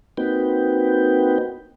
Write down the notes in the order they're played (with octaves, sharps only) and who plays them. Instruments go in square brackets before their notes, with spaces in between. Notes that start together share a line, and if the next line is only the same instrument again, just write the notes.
[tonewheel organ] A#3 C4 D#4 F#4 B4 G5